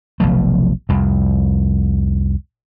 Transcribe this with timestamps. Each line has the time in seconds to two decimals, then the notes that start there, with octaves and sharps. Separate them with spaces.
0.20 F1 B1 F3 A3
0.89 C2 F2